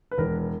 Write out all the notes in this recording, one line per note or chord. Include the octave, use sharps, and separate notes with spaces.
B4
E1 A#4